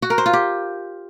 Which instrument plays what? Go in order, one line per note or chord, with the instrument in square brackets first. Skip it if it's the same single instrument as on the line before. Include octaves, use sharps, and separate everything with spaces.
[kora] F#4
A#4
C5
F4
G4